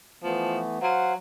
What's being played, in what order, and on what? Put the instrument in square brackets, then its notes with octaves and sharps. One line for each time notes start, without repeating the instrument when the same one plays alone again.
[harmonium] E3 A3 B3 [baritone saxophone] F3
[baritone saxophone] F#3 [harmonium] C5 F5 F#5